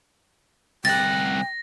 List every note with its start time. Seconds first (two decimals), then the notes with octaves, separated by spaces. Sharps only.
0.85 C2 F#5 G5 A6 A#6